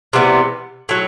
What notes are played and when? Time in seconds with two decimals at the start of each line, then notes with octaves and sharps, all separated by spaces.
0.13 C3 E3 G3 B3
0.89 A2 F#3